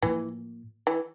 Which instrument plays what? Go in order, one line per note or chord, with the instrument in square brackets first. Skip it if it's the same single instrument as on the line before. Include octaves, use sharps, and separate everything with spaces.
[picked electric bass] A2 F3 A#3 [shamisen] E3
[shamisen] E3